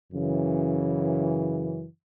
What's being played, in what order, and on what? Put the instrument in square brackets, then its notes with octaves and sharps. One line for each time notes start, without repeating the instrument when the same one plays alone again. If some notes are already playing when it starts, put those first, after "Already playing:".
[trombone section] F#2 C#3 E3